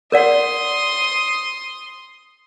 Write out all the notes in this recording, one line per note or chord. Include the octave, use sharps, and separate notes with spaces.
A#4 D5 F#5 C6 D#6